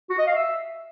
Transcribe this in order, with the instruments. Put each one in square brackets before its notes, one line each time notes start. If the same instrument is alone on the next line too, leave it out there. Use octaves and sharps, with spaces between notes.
[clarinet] F#4
D#5
F5
E5